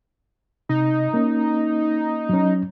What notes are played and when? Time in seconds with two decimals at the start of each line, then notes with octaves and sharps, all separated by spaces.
0.69 C3 D#4
1.14 A#3 C#4
2.29 F#3 C#4